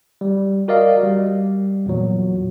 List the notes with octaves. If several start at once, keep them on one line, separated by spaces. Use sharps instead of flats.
G3
F#4 A#4 D5 D#5 F5
G3
E2 A#2 F#3